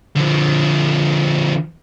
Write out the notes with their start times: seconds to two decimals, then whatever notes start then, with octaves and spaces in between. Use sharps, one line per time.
0.16 D3 F3